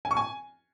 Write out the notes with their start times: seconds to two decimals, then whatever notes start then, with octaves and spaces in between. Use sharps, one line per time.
0.05 G#5
0.11 C#6
0.17 G#5